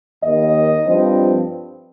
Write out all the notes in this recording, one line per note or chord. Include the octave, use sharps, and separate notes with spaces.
D#2 D#3 A#3 D#5
G2 F3 C4